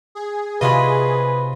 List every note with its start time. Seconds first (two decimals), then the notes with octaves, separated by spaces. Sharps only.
0.15 G#4
0.61 C3 F4 F#4 B4 D#5 B5